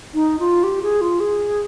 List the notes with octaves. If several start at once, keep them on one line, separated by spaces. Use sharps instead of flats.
D#4
F4
G4
G#4
F4
G#4